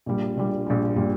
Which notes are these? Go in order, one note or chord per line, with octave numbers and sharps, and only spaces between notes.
A#1 A#2 G3
A#1 A#2 G3
A#1 A#2 G3
A#2 G3